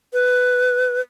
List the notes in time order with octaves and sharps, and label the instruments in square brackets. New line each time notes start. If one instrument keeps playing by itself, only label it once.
[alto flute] B4